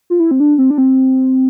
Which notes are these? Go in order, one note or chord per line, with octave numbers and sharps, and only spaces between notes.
F4
E4
C4
D4
C4
D4
C4